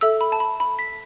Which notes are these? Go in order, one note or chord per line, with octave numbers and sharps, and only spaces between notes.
A4 E5 E6
B5
A5
B5
B5
B6